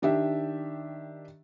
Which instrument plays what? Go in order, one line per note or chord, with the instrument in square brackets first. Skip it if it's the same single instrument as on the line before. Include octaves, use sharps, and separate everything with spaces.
[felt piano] D#3 D4 G4 E5